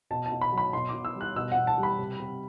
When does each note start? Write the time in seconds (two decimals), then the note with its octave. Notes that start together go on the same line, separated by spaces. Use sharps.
0.10 B2 A5
0.26 A5
0.31 B2
0.41 B5
0.52 F#3
0.58 B5
0.73 B2 C6
0.89 B2 D6
1.05 E6
1.15 G3
1.21 F#6
1.36 B2 E6
1.52 B2 F#5
1.67 A5
1.78 G3
1.83 B5
1.99 C3
2.20 C3